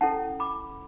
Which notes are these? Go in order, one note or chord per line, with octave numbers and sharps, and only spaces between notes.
C#4 E4 A4 F#5 A5
B5 D6